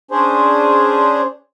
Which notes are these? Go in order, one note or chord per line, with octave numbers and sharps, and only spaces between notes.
C#4 D4 G#4 C5